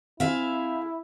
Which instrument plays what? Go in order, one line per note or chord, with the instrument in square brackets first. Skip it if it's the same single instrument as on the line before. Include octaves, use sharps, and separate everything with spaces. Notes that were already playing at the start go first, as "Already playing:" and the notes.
[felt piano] C4 [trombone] E4 [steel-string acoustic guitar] G#4 E5 F5